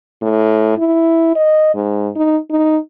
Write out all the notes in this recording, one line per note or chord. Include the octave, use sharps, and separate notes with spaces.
A2
E4
D#5
G#2
D#4
D#4